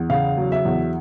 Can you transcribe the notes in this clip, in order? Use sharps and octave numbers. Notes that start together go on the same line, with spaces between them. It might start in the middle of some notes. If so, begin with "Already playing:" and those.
Already playing: E2
C#3 F5
F#3
E5
E2